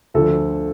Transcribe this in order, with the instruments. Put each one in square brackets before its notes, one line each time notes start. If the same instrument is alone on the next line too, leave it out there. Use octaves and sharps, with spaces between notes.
[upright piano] D2 D3 F3 A4